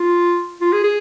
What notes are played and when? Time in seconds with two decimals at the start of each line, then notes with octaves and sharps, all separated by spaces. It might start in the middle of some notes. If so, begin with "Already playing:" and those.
Already playing: F4
0.61 F4
0.73 G#4
0.84 G#4